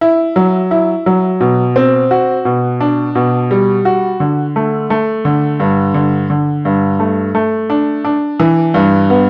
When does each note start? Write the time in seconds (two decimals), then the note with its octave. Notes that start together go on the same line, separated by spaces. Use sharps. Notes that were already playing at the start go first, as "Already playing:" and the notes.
0.01 E4
0.36 F#3
0.71 E4
1.06 F#3
1.41 B2
1.76 C4
2.11 F#4
2.45 B2
2.80 D4
3.15 B2
3.51 G3
3.85 F#4
4.20 D3
4.56 A3
4.90 A3
5.25 D3
5.60 G2
5.94 D3
6.30 D3
6.65 G2
6.99 A3
7.35 A3
7.70 D4
8.04 D4
8.40 E3
8.74 G2
9.10 B3